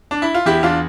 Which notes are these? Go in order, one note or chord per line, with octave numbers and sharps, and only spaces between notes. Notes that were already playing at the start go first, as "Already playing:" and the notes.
D4
E4
F4
E2 E4 G4
E2 D4 F4